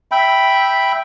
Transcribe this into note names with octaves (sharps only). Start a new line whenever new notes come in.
E5 G5 B5